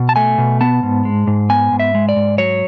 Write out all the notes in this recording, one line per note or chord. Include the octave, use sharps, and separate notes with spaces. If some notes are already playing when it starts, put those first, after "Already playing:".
Already playing: B2
A5
A3 G#5
B2
B3 A5
G#2
G#3
G#2
B3 G#5
G#2
E5
G#3
D5
G#2
F#3 C#5